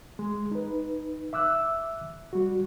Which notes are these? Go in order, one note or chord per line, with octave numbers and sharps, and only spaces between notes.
G#3
D#4 B4
E5 D6 E6 F#6
G3 F#4